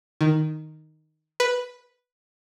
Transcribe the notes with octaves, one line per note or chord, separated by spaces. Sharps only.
D#3
B4